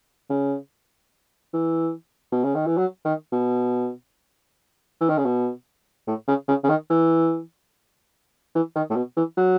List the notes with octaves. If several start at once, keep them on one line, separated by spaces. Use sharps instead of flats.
C#3
E3
B2
C#3
D#3
E3
F#3
D#3
B2
E3
D#3
C#3
B2
A2
C#3
C#3
C#3
D#3
E3
E3
D#3
A2
B2
E3
F#3